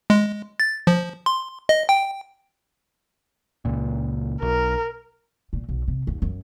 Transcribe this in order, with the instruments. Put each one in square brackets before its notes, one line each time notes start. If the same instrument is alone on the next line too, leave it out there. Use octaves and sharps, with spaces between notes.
[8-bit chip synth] G#3
A6
F3
C6
D#5
G5
[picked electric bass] C#2 A#2
[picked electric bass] B1 [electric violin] A#4
[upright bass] A#2
B1
C3
D#2
F#2